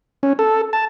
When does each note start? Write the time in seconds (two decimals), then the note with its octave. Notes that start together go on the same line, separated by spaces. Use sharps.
0.23 C#4
0.39 A4
0.73 A5